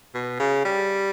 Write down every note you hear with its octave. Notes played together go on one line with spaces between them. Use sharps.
B2
C#3
G3